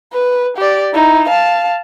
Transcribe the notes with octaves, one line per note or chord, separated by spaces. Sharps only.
B4
G4 D5
D#4 E4
F5 A5